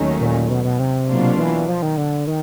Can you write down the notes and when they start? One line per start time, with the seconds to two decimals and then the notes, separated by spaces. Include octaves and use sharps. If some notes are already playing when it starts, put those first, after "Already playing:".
Already playing: D#2 D#3 F#3 A3 C#4
0.20 A#2
0.50 B2
0.64 B2
0.79 C3
1.08 B2 F#3 A#3 D4 F4
1.38 E3
1.68 F3
1.82 D#3
1.98 D3
2.27 D#3